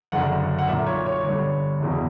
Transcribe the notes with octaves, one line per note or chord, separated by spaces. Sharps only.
F#1 F#2 D3 F#5
F#5
B1 A#2 E5
C#5
C#5
G1 G2 D3 C#5
F#1 E2 B2